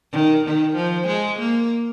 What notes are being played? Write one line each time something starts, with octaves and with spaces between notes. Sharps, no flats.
D#3
D#3
F3
G#3
A#3